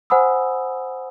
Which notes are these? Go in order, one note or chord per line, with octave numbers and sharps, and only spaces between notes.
C5 F#5 G#5 B5 D#6 E6